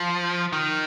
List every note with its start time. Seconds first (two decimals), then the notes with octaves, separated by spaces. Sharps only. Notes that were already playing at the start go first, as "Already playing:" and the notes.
Already playing: F3
0.53 D#3